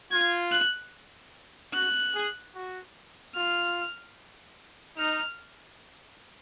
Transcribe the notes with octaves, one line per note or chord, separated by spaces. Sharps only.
F4 G#6
F#6
F#4 F#6
G#4
F#4
F4 F6
D#4 F6